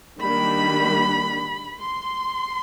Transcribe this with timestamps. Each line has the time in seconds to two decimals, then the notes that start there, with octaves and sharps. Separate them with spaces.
0.21 D#3 G3 A#3 D4 B5
1.79 C6